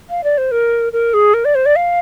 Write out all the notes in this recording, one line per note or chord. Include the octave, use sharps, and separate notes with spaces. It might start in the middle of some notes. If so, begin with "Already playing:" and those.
F5
D5
C5
A#4
A#4
G#4
A#4
D5
C5
D5
F5